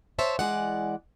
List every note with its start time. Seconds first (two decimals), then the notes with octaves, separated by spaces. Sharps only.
0.19 C5 C#5 E5 A5
0.39 E3 G#3 D5 F#5